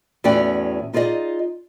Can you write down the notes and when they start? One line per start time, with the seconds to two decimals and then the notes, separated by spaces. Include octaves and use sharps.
0.24 E2 A2 C#4 F#4 D5 G5
0.93 D#4 F4 G#4 D5 D#5